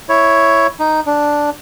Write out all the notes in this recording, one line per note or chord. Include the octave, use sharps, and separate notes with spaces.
E4 C#5
D#4
D4